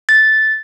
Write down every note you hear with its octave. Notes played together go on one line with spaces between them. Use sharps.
A6